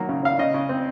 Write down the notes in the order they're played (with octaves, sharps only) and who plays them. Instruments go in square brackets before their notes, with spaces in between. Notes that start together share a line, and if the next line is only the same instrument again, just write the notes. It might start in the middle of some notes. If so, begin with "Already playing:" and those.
Already playing: [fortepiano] D#3 F#3 A#3
C#3
C#3 F5
C#3 D#5
C#3
C4